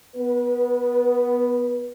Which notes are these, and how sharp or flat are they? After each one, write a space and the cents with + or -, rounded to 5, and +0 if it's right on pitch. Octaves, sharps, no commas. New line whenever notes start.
B3 +0 B4 -30